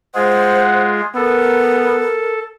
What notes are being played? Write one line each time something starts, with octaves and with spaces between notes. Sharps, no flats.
G#3 F4 G#4 C5 F#5
B3 A4 A#4